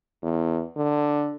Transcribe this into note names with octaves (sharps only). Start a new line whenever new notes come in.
E2
D3